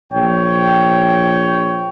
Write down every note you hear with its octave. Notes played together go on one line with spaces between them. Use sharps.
A#1 C#5 G5